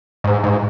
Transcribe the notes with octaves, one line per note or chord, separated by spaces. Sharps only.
G#2
G#2